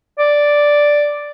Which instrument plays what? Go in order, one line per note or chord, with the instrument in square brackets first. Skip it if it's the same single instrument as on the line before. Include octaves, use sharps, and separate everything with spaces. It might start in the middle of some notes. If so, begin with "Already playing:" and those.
[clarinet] D5